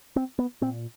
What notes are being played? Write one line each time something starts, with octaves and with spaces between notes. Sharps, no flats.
C4
B3
A#2 C4